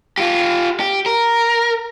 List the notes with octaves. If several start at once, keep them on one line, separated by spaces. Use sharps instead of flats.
F4 G4
G4
A#4